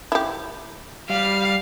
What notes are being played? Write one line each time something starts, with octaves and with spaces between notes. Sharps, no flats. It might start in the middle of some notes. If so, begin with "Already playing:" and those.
E4 G4
G3 F5